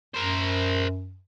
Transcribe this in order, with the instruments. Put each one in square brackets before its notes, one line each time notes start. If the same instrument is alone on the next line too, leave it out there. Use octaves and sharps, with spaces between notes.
[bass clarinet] F#2 [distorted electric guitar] A#4 C5